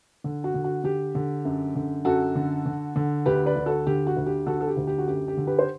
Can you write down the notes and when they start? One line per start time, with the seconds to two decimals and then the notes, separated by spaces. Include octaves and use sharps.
0.24 D3
0.44 F#4
0.54 D3
0.64 F#4
0.84 D3 G4
1.15 D3
1.45 F#2
1.75 D3
2.05 F#2 F#4 A4
2.35 D3
2.66 D3
2.96 D3
3.26 D2 G4 B4
3.46 B4 D5
3.56 D2
3.66 F#4 A4
3.87 D3 G4
4.07 F#4
4.17 D2
4.26 G4
4.47 D3 F#4 A4
4.61 A4
4.67 G4
4.77 D2
4.87 G4
4.98 F#4
5.07 F#2 G4
5.28 G4
5.37 D3
5.47 G4 B4
5.59 C5